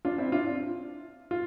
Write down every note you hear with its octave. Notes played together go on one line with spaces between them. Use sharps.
D4 F4
C4 E4
D4 F4
F4